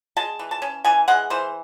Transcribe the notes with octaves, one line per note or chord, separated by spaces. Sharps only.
G#3 A5
E3
A5
C#4
E3 G#5
G#3 F#5
E3 C5